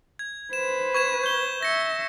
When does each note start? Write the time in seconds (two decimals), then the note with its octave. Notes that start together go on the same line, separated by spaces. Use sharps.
0.19 G#6
0.53 B4 C5 E7
0.94 C#6 G#6 E7
1.23 G6 G7
1.63 E5 A#6 C#7